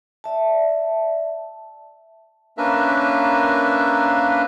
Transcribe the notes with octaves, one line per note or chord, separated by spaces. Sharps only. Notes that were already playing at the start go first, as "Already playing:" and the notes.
D5 E5 A5
A#3 C#4 D4 A#4 B4 E5